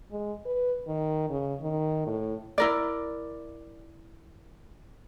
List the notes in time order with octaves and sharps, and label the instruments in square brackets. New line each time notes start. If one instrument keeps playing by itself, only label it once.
[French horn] G#3
B4
D#3
C#3
D#3
A2
[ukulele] E4 A#4 D5